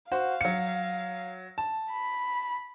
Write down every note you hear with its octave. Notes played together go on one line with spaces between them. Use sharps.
F#4 C5 F5
F#3 C#7
A5
B5